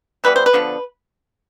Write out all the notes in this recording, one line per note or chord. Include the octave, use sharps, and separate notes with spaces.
E3 G3 B3 B4
C5
B4
D3 F3 B3